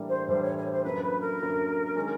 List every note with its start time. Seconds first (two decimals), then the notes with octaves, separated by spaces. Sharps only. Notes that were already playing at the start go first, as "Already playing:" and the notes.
Already playing: A2 E3 G3 A#3 D4
0.09 C5
0.28 A2 E3 G3 A#3 D4 C5
0.42 C#5
0.56 C#5
0.70 C5
0.84 F#2 D3 F#3 A#3 B4
1.02 B4
1.21 A#4
1.40 F#2 D3 F#3 A#3
1.96 D#3 G#3 C#4